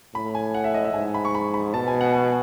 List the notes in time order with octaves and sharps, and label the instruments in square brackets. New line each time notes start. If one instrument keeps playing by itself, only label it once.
[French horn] A2 [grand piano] B5
[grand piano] G#5
F#5
E5
D#5
E5
[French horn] G#2 [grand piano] G#5
[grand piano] B5
C#6
B5
B5
[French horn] B2 [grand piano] A5
[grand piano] G#5
F#5
G#5